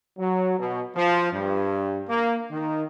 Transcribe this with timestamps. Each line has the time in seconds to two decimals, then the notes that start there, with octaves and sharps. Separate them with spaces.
0.19 F#3
0.58 B2
0.96 F3
1.32 G2
2.08 A#3
2.51 D#3